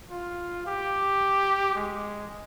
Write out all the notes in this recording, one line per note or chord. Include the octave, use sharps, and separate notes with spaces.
F4
G4
G#3